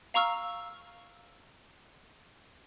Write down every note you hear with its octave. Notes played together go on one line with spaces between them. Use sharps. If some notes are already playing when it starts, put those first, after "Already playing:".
F5 A#5 C#6 E6 F6